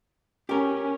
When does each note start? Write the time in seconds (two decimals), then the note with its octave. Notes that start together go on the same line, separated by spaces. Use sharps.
0.49 C#4 G4 A#4